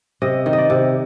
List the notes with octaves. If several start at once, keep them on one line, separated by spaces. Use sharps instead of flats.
C3 D#5
D#3
D#5
D5
C3